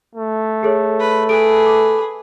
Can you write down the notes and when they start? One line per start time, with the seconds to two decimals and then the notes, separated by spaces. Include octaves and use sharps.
0.15 A3
0.63 G#4 A4 C#5
1.00 B4
1.29 G#4 A4 B4 D7
1.66 D6